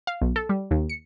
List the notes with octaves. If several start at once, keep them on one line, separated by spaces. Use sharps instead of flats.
F5
B1
A4
G3
D#2
C#7